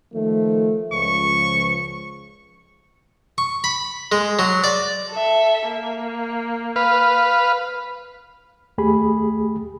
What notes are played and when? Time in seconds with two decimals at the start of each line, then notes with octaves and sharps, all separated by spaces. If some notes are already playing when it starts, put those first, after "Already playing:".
0.13 D#3 F3 A3
0.92 C#2 F3 C#6
3.38 C#6
3.64 B5
4.12 G#3
4.39 F#3
4.64 D5
5.11 A4 E5
5.67 A#3
6.76 B4 F5
8.78 D#2 A3 G4 G#4 B5